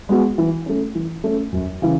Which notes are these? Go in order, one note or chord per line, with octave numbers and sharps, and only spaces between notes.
G#3 B3 F#4
E3
A3 C#4
E3
A3 C#4
F#2
C#3 E3